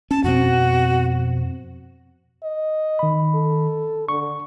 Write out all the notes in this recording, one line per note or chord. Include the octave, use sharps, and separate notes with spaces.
C#4 A5
F2 B2 C4 F#4
D#5
D#3 B5
A4
D3 C#6